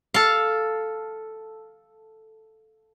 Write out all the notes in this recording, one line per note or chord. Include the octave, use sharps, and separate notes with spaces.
A4 F5